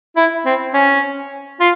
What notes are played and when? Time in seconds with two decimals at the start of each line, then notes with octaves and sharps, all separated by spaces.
0.16 E4
0.45 C4
0.73 C#4
1.60 F4